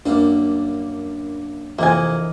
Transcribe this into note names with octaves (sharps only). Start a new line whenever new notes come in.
F#2 G3 A#3 D4
F2 C3 E3 A#3 D#5 G#5